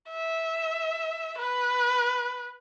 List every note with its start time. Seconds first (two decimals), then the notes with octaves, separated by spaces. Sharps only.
0.11 E5
1.38 B4